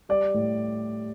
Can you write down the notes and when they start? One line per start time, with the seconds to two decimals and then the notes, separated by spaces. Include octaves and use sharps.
0.09 G3 D5
0.34 A2